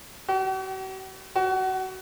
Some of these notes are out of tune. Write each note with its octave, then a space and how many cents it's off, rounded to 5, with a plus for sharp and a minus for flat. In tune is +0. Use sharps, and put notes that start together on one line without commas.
F#4 +45
F#4 +25